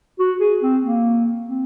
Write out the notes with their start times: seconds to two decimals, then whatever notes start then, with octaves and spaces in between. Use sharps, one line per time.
0.19 F#4
0.40 G#4
0.62 C4
0.83 A#3
1.50 C4